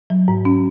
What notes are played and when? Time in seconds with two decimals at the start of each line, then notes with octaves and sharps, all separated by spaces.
0.10 F#3
0.28 G#2
0.45 C#4